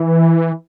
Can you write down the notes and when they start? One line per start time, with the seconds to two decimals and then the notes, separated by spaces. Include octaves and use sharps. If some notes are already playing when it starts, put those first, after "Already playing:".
Already playing: E3